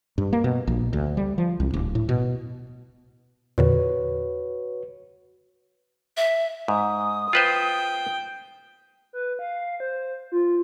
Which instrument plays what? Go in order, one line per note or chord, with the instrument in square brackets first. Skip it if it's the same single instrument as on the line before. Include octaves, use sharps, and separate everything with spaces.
[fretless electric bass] G2
A#3
B2
A#1
D2
G3
F3
C2
D1
A2
B2
[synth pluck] E2 A#2 D3 [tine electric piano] F#4 B4 C#5
[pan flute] E5
[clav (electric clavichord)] G#2 [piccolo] D#6
[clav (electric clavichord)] F4 B4 C5 [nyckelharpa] G5
[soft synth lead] B4
F5
C5
F4